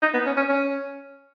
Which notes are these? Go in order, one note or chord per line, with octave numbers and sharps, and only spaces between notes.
D#4
B3
C#4
C#4
C#4